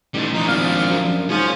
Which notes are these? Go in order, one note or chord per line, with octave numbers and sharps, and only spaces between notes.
A1 G3 D#4
F3 D4 D#4
G#1 F5
F#2
G#2 F3 C#4